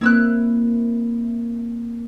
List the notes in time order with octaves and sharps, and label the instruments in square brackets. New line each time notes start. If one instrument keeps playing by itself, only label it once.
[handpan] A#3 C4 [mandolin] E4 E6 F#6